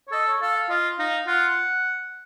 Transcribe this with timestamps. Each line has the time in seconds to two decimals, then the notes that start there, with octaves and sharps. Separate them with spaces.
0.08 C#5
0.12 A4 D#5
0.28 C#5
0.41 A4 F5
0.55 F5
0.69 F4 D#5
0.98 D#4 F5
1.27 F4 F#5